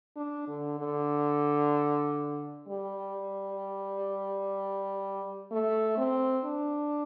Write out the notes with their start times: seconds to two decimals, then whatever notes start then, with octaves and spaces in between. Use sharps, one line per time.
0.16 D4
0.48 D3
0.79 D3
2.69 G3
5.52 A3
5.98 C4
6.45 D4